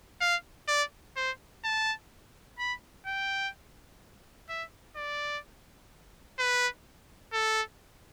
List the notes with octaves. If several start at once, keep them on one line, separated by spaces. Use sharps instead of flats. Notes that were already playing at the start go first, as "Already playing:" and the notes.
F5
D5
C5
A5
B5
G5
E5
D5
B4
A4